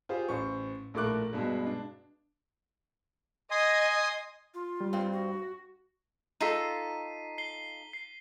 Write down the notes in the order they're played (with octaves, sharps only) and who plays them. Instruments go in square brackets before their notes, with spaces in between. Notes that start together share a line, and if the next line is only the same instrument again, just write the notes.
[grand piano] F4 G4 G#4 C5
A1 C5 C#6
A#1 A2 A3 A#4 D6 F#6
G2 B2 G#3
D4
[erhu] D#5 [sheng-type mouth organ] G#5 C6 D#6
[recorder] F4
[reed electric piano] G3
[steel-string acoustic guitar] G2 C4
[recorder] F#4
[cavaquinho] D#4 F4 A4 [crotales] B6 C7 D#7
[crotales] C7 G7
C7